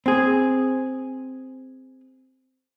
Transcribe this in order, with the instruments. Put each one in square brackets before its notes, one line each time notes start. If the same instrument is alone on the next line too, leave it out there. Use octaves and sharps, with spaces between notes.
[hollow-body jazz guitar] C4 G#4